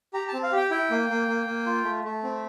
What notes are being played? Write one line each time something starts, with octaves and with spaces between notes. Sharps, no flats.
G4 A#5
A5
C4
F5
G4 G5
E4 G5
A#3
A#3
A#3
A#3
F4
A3
A3
C4